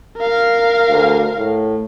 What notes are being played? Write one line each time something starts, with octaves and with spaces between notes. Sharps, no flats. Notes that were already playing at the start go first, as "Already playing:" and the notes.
A#4 F5
D2
A2